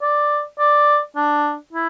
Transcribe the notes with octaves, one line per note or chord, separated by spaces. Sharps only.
D5
D5
D4
E4